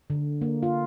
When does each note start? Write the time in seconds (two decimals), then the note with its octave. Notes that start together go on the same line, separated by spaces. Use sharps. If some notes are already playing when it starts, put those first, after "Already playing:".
0.10 D3
0.41 A#3
0.63 F4